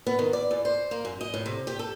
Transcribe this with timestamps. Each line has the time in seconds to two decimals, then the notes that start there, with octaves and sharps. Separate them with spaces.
0.07 B3
0.19 D#3
0.33 D5
0.51 E2
0.65 C5
0.91 A#3
1.05 F#2
1.21 D#5
1.34 A2
1.46 C3
1.67 G4
1.79 A4